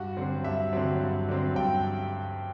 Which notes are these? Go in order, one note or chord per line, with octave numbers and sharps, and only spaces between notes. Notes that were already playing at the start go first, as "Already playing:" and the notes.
Already playing: G2 F#4
D3 F#3 C4
G2 E5
D3 F#3 C4
G2
D3 F#3 C4
G2 G5